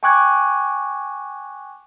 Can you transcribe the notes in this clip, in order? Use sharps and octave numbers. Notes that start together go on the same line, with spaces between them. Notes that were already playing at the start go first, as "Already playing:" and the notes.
G5 G#5 C#6 D6 F#6 G#6